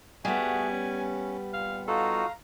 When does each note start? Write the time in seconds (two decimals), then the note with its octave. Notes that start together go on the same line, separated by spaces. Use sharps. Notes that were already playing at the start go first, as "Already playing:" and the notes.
0.25 G3 A3 B3 F#4 G#4 G#5
0.72 C#4
1.54 A#2 F5
1.88 D#4 F4 F#4 A4 F5 A#5